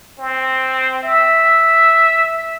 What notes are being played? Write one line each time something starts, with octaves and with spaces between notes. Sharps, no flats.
C4
E5